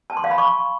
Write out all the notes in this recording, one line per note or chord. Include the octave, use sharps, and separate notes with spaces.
A5
C6
F5
B5
C#6